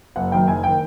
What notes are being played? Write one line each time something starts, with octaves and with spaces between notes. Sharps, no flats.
F#1 F#5
F#2 D#3 G5
F#1 G#5
D#3 G5